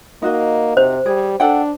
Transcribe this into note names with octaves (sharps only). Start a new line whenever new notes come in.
A#3 D#4 F#4 D#5
C3 C5
G3 G#4
D4 A4 F#5 G5